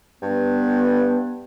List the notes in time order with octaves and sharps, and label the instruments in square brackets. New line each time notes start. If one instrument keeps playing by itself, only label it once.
[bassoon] G2 [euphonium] B3